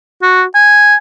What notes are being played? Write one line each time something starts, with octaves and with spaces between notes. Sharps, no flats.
F#4
G#5